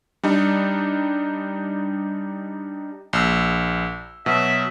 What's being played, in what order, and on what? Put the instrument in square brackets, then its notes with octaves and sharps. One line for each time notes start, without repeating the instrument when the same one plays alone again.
[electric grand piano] G3 D4 D#4
A#1 E6
[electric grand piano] B2 F#3 [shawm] E5